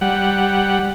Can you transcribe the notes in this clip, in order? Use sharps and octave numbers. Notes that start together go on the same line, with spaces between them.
G3 F#5